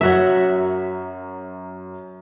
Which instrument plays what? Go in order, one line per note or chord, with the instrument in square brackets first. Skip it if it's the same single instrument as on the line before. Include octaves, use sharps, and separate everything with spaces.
[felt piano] F#2 [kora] F#3 F#4 E5